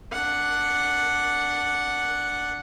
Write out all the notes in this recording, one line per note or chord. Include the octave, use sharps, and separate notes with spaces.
D4 F#5